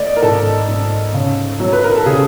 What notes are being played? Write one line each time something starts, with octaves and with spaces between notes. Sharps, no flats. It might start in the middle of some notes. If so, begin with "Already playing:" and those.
Already playing: A3 D5 D#5
A#4
G#2 A4
G#2
C#3
F#3
B4
A#4
A4
C#3 G#4